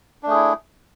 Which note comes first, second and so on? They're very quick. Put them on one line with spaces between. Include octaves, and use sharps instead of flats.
D4 A3 G#4 E4